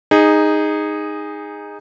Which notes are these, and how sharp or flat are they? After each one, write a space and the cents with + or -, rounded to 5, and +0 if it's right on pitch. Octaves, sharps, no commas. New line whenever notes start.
D#4 -5 G#4 -15